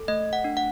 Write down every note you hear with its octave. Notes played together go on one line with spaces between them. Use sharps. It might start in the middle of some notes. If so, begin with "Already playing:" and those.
Already playing: A4
A3 D#5
F#5
D4
F#5